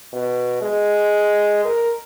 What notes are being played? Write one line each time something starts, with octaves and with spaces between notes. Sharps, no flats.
B2
G#3
A#4